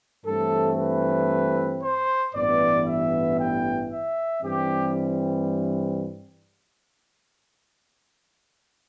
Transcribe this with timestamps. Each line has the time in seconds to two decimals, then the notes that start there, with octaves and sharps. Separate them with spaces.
0.25 G2 E3 A3 C4 A4
0.77 B4
1.81 C5
2.34 A1 G2 E3 B3 D5
2.86 E5
3.38 G5
3.91 E5
4.43 G2 E3 G3 C4 G4